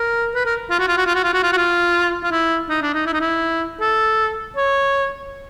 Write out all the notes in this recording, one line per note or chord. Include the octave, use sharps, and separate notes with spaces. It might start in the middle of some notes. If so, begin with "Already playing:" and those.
Already playing: A#4
B4
A#4
F4
F#4
F4
F#4
F4
F#4
F4
F#4
F4
F#4
F4
F4
E4
D#4
D4
D#4
E4
D#4
E4
A4
C#5